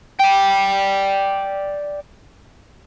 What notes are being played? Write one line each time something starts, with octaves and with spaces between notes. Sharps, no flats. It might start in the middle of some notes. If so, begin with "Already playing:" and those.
D5 G5